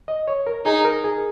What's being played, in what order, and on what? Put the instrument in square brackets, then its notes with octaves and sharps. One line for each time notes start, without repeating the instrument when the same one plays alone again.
[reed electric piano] D#5
C#5
A#4
[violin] D#4 [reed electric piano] G#4
[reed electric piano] A#4
G#4